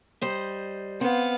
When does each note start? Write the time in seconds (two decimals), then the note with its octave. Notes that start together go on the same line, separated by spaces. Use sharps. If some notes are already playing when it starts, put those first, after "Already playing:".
0.21 G3 C5 D#5
1.01 B3 C4 F5